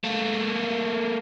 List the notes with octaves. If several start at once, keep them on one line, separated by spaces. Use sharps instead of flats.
A3 A#3